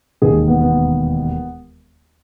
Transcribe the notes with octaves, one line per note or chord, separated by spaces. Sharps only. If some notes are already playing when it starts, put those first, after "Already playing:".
E1 D#2 D#3 G#4
B3
B3